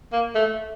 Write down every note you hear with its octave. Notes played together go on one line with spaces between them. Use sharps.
A#3
A3